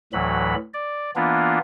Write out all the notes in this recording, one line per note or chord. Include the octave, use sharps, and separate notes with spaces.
D2 A2 E3 F#3 B5
D5
E3 A#3 B3 D4 F4